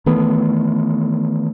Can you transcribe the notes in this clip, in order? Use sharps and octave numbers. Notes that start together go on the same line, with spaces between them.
D#3 E3 A3 B3